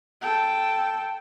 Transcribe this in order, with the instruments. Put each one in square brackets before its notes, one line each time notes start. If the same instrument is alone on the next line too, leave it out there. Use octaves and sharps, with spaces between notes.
[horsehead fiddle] A4 G5